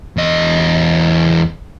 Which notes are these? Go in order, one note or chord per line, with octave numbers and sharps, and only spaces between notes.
E2 D#5